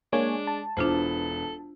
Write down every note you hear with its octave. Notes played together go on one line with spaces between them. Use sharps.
G#3 A#3 D4 C#5 G#5
A5
E1 B3 D4 E4 F4 A4 C5